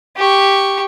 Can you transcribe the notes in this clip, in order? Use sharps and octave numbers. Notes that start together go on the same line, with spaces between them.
G4 C#6